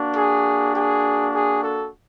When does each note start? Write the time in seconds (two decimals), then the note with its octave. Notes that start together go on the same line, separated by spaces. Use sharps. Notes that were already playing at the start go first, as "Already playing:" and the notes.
Already playing: A#3 D4 F#4
0.16 G#4
0.75 G#4
1.33 G#4
1.61 A4